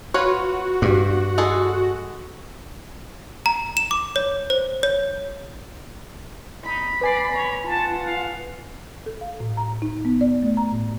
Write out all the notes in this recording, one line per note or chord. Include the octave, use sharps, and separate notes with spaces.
F4 F#4 B4 C#5
G2
G#3 G#4 A4
A#5
E7
D6
C#5
C5
C#5
D#4 B5
B4 D5 G#5 C7
C#5
F4 F#5 A5
F5
A4
F5
A2
A#5
D#4
B3
D5
A3
A#5
A2